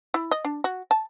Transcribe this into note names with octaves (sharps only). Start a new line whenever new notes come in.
E4
D#5
D4
F#4
A5